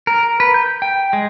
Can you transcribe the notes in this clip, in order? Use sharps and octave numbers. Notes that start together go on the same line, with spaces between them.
A#4
B4
G6
G5
G#3